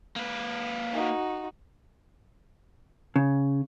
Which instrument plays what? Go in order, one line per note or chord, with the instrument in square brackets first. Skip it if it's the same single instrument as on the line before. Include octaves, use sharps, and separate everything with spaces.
[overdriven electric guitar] A#3 B4
[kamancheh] D#4 F#4
[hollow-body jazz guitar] C#3